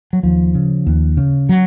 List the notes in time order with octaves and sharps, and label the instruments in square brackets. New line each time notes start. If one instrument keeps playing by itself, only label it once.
[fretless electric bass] F#3
D#2 F3
C#3
D#2
C#3
F#3